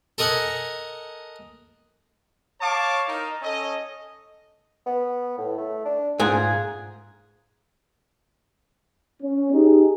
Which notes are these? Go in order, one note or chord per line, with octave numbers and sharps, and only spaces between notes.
A4 A#4 D#5 F#5 G#5
C#5 F5 A5 C#6 D6
D#4 A#4
C#4 A4 D#5
B3
A2
A3
D4
G#2 F4 G#4
C#4
D#4 G4 G#4